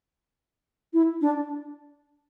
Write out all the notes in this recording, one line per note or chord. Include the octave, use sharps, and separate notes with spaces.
E4
D4